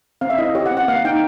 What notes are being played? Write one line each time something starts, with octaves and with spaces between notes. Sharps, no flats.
C4 F5
E5
E4 D#5
G4 C#5
F#5
C4
F#5
A#3 F5
D#4 G5